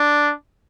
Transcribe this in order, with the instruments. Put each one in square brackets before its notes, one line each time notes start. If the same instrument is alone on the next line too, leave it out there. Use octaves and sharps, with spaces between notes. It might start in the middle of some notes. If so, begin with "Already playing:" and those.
Already playing: [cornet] D4